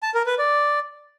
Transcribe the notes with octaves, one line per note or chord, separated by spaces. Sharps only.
A5
A#4
B4
D5